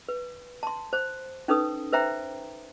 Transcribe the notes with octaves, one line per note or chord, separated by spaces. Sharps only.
B4
A5 C6
C5
C#4 D#4 A4 B4 D#6
B4 C5 E5 G5 A#5